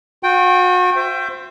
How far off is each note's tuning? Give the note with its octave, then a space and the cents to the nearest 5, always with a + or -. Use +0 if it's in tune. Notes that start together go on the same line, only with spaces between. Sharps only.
F#4 -35 G5 -5
C5 +0 E5 +30